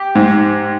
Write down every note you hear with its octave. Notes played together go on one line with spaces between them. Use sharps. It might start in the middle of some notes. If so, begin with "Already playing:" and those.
Already playing: G4
G#2